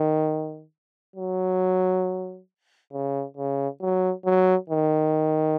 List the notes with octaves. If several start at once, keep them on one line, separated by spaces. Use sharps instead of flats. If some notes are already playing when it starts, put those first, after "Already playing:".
Already playing: D#3
F#3
C#3
C#3
F#3
F#3
D#3